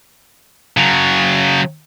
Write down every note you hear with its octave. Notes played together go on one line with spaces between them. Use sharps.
C#3 F#3